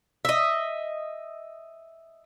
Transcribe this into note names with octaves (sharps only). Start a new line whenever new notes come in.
D#5 E5